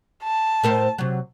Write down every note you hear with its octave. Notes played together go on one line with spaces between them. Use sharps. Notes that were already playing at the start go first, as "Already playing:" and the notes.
A5
A2 A#4 C5
C3 F#3